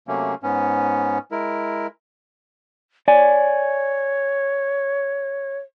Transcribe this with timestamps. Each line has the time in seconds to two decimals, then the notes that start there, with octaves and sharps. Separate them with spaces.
0.08 C3 F#3 A3 A#3 C#4
0.43 G#2 B3 C#4
1.31 G#3 E4 A#4
3.08 C#5 D5 G#5